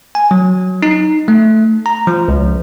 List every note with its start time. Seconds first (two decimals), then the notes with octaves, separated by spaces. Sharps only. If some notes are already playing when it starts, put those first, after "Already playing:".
0.15 G#5
0.31 F#3
0.83 D#4
1.28 A3
1.86 A#5
2.07 F3
2.28 C#2